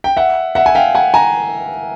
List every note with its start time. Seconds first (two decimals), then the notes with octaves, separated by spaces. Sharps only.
0.04 G5
0.17 E5 F#5
0.55 E5 F#5
0.66 G#5
0.75 F5 G5
0.95 F#5 G#5
1.14 G#5 A#5